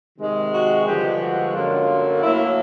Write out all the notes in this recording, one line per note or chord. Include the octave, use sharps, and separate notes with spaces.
C3 D#3 G#3
F#4
G2 D3 F3 G#3 G4
F#4
F#2 D3 F#3 A#3 F4
A2 F#3 A#3 E4